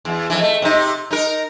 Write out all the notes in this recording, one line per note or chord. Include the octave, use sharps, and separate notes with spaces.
E2
F2 E3
A3
C3 D#4
D#4 A#4